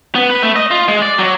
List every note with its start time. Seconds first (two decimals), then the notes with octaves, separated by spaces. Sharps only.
0.15 B3
0.30 B4
0.42 A3
0.56 D#5
0.71 F4
0.88 G#3
1.02 D5
1.18 F#3